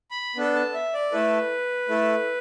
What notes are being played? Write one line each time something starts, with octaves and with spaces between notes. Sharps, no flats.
B5
B3 D4 A4
A5
E5
D5
A3 E4 A4 B4
A3 E4 A4